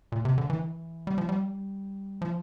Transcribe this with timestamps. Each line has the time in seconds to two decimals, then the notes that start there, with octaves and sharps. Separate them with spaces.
0.12 A#2
0.25 C3
0.38 D3
0.50 E3
1.07 G3
1.18 F3
1.29 G3
2.22 F3